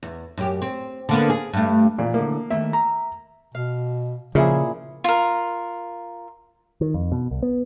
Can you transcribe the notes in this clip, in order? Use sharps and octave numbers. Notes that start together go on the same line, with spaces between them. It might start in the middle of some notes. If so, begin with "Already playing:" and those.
E2
F#2 G4
C4
D3 A#3 B3
G#4
G2 A3
A#2 E3
A2 D3 A#3
D#3 A3 A#3 E5
A#5
B2 F5
A#2 C#3 F3 E4 G#4
F4 A#4
D#3
F2
B2
C2
B3